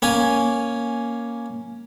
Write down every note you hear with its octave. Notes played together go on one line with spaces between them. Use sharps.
A#3 C#4 G#5